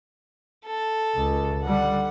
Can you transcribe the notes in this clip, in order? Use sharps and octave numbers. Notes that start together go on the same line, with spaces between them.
A4
C#2
D3 G3 F#5